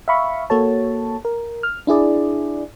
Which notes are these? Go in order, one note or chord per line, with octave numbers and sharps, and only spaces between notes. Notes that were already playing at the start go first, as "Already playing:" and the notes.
E5 F5 B5 C#6
A#3 F#4 A4 C#5 A5
A#4
F6
D4 E4 G#4 D5